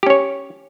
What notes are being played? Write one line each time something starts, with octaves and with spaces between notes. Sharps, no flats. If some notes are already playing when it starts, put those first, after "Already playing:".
C#4 G4 C#5